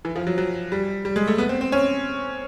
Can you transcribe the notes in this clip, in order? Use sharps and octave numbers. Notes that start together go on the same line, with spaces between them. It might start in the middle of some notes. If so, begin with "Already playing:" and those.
E3
F3
F#3
F#3
G3
G3
G#3
A3
B3
C4
C4
C#4